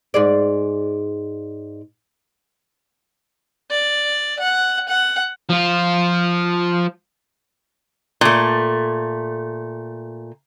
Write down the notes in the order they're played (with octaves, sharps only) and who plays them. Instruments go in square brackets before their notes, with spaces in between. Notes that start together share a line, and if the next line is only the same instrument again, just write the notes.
[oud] G#2 G#4 D5
[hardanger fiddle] D5
F#5
F#5
[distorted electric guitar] F3 F4
[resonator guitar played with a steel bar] A#2 A3